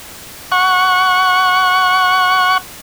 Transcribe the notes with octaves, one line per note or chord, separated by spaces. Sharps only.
F#5 C#6